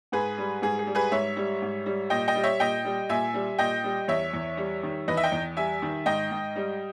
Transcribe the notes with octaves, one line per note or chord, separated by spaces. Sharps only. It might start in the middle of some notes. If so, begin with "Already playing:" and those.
G#2 G#4 B4
G3
G#2 G#4
G#4
G3
G#4 B4
G#2 C#5 E5
G3
G#2
G3
A#2 D#5 G5
D#5 G5
G3
C#5 E5
A#2 D#5 G5
G3
A#2 E5 G#5
G3
A#2 D#5 G5
G3
E2 C#5 E5
E2
G3
D#3
E2 B4 D#5
E5
D#5 G5
E2
G3 E5 G#5
D#3
G#2 D#5 G5
G#2
G3